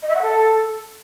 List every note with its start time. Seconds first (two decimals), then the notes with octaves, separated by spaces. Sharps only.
0.02 D#5
0.09 E5
0.15 F#5
0.22 A4